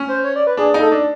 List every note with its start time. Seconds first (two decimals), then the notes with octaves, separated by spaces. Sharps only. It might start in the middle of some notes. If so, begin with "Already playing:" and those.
Already playing: C#4
0.08 C5
0.24 C#5
0.36 D5
0.47 B4
0.57 D4 G#4
0.74 D#4
0.80 A4
0.92 D4